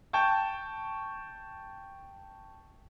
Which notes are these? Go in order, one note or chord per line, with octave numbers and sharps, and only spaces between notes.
G5 A5 C#6 G6